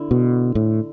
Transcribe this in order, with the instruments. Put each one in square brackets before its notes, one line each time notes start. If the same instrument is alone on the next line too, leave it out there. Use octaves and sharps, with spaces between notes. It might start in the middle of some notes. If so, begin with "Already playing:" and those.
Already playing: [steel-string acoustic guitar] D3 B3 E4 D5
[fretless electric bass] B2
A2